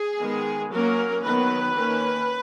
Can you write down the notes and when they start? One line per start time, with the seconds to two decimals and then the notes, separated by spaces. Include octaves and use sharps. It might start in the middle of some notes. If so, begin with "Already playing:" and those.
Already playing: G#4
0.20 D#3 G#3 B3
0.72 F#3 A#3 C#4 A#4
1.25 D#3 F#3 B3 B4
1.77 D#3 A#3 C#4